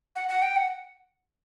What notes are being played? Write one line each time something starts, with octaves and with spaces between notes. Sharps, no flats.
F#5
F#5
G5
F#5